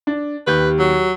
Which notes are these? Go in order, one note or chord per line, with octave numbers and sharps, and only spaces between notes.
D4
D#2 G4 B4 G6
F#3